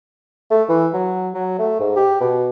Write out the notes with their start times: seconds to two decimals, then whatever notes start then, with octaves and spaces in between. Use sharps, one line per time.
0.51 A3
0.69 E3
0.93 F#3
1.34 F#3
1.59 A3
1.80 G#2
1.96 G4
2.20 B2